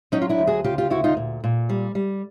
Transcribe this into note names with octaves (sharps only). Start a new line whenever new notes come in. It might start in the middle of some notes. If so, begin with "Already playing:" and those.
F#3 C#4 D#4
F4
D4 E4
D2
F#4 G#4
C#3 F4 G4
F4 G4
D2 E4 F#4
D#4 F4
A#2
A#2
G3
G3